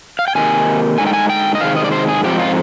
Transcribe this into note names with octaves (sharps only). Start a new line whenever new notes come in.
F5
G5
C3 D#3 A#3 D#4 G#5
D3 G#3 D#4 G#5
G5
G#5
G5
D#5
C3 D#3 G#3 F5
D#5
D5
C5
G#4
G#2 F3 C4 D#4 G4
F4